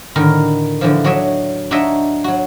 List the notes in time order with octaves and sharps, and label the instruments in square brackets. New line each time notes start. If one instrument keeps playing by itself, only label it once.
[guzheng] A2 D3 D#3 A#4
D3 E3 F3
F#3 D4 C#5 D#5 E5
D4 D#4 F#4 C#5 D#5 E5
F#3 F#4